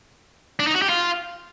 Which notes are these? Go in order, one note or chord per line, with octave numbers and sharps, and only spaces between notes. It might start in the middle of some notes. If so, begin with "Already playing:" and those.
D4
D#4
F#4
G4
F4